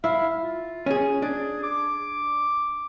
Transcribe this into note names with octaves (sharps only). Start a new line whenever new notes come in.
E4 F5
F4
C#4 G#4
D4 G#4
D6